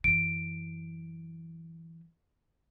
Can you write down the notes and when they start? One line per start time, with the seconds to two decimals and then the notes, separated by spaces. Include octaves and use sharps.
0.04 F#2 E3 D7